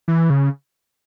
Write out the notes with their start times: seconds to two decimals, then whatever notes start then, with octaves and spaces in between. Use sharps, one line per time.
0.08 E3
0.30 C#3